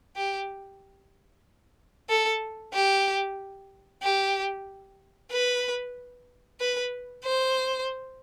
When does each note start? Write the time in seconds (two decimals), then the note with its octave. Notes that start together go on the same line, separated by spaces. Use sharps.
0.17 G4
2.09 A4
2.73 G4
4.03 G4
5.32 B4
6.60 B4
7.24 C5